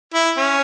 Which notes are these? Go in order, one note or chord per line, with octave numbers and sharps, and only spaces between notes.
E4
C#4